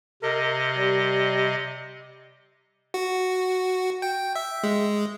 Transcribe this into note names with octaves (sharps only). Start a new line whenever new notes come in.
C3 A#4 D#5
G3
F#4
G5
E5
G#3